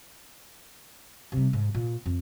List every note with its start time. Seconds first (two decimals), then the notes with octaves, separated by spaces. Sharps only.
1.32 C3 G3
1.53 G#2
1.75 A#2
2.06 F2